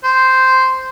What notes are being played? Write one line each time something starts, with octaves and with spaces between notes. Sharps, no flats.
C5